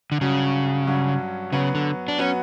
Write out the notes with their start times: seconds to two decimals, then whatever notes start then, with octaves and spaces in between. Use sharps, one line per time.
0.12 D3
0.21 G2 C#3 F#3 C#4 F#4
0.87 G2 F#3 C#4 F#4
1.52 C#3 F#3 B3 F#4
1.75 D3
2.08 D4
2.19 F#3 B3 C#4 F#4